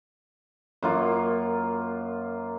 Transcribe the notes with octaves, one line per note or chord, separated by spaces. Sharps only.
F#2 A#3 F4